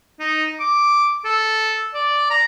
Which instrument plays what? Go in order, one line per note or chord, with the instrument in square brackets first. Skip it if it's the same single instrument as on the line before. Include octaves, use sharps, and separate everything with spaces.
[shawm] D#4
D6
A4
D5
A#5